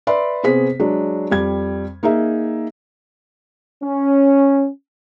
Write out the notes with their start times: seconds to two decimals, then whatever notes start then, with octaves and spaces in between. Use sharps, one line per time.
0.07 B4 D5 E5 B5 C6
0.43 C3 B3 G#4 C5 B6
0.80 F#3 G#3 D4
1.30 F2 G3 G#6
2.03 A#3 D#4 G#4 E5
3.84 C#4